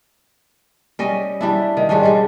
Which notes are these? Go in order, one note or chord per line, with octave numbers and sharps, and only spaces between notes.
G3 C#4 D#5
G3 D4 E4
D#3
G#2 G3 C#4 D4
G3 G#3